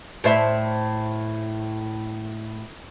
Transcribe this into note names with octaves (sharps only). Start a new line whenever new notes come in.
A2 C5 E5